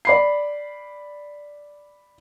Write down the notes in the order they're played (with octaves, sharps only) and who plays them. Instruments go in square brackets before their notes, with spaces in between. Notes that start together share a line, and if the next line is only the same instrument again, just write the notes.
[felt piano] D5 B5 C7